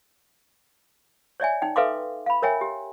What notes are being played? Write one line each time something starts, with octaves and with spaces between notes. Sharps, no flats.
C#5 D5 E5 G#5
D#4 G5
A4 B4 E5 F5 C6 D6
F5 B5
A#4 C#5 E5 G5 G#5
G4